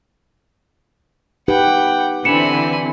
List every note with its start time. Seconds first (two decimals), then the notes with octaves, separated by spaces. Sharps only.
1.48 D#4 G4 B4 F#5 G5
2.25 D3 E3 C4 G#5 B5 C#7 E7